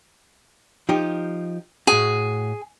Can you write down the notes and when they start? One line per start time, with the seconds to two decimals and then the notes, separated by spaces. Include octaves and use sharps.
0.89 F3 D#4 G4
1.87 A2 F#4 G#4